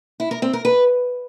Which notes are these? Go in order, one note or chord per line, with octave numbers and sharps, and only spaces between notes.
E4
A#4
C4
A#4
B4